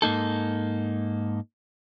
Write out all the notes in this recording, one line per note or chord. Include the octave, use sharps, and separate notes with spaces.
G#2 A#3 D#4 A4